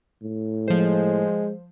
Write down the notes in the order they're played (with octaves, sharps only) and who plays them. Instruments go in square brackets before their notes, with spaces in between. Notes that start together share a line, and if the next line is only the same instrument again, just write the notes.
[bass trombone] A2
[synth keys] F3 C5 [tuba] G#3